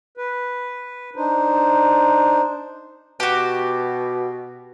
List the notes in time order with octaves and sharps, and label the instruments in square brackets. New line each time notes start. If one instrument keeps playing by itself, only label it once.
[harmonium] B4
D4 D#4 C5
[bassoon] B2 [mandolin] F#4 G4